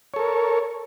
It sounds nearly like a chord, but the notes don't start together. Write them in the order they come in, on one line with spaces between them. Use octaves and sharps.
C#5 A4 A#4